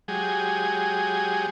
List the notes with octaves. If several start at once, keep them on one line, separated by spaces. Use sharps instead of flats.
F#3 G#3 G4 G#4